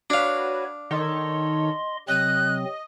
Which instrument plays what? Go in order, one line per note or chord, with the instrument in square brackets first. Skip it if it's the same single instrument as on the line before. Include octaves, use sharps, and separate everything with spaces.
[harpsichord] D4 F5 [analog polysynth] F#4 B4 [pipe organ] C#5
[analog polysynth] D#3 A4 C#5 [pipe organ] D#5 C6
[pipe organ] C3 F#3 C4 [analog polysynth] D#5 [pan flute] F#6